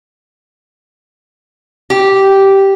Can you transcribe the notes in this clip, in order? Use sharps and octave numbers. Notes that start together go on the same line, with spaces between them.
G4